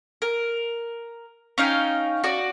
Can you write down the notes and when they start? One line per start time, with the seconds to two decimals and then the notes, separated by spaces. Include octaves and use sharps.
0.22 A#4
1.58 C#4 D#4 F5 G5
2.24 F#4 D5